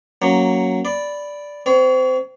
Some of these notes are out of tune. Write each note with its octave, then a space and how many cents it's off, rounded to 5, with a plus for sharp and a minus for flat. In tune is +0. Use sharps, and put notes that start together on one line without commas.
F#3 +0 A#3 +0 C#4 +0
D5 -5 B5 +0
C4 -25 C#5 +35